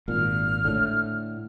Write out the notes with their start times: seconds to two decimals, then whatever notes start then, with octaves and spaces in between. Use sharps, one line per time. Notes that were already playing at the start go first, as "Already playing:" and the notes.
0.08 G#1 A#2 F6
0.65 A2 D3